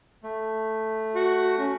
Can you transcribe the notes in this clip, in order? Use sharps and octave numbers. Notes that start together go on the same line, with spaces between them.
A3
F#4
C#4